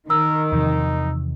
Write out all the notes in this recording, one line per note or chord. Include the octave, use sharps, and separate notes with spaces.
D#3 A#4 E6
E2 C3 F3 D#4